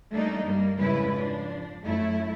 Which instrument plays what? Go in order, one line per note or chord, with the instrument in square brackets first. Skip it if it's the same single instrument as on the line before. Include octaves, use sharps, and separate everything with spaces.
[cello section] G3 A3 A#3 D4 D#4
G2 G3 A#3
F2 G#2 C#3 G3 E4 B4
F3 D4
F#2 A3 E4